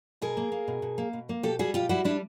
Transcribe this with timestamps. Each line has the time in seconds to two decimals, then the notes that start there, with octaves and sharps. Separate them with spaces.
0.22 B2 G#4 A#4
0.37 A#3
0.52 A#3
0.68 B2
0.82 B2
0.98 A#3
1.13 B2
1.29 A#3
1.43 B2 G4 A4
1.59 G3 F#4 G#4
1.74 B2 F4 G4
1.89 G3 E4 F#4
2.04 G3 D4 E4